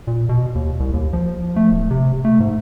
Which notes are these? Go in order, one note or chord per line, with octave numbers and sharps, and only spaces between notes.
A#2
B2
D#2
C2
D#2
F3
A3
D1
C3
A3
G#2